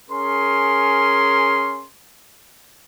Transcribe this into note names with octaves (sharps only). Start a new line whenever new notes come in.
C#4 G#4 A#4 C6